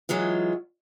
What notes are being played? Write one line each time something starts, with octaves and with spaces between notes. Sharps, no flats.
E3 F#3 G#3 F4